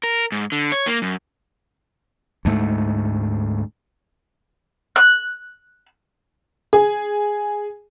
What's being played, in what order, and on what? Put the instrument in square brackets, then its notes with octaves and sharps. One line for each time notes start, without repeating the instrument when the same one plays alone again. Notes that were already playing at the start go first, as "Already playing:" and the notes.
[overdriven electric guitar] A#4
G#2
D3
C#5
A#3
F#2
[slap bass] D2 G#2 A3
[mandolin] F#6
[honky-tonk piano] G#4